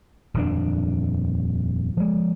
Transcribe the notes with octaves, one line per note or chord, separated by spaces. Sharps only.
D#1 F2 D4
F3 G#3